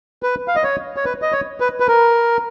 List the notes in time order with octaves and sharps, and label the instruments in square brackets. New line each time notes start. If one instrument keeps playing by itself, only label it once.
[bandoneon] B4
F5
D#5
C#5
C#5
B4
D#5
C#5
B4
B4
A#4